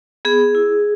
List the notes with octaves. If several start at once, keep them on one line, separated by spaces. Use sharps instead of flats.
B3 G#4
E4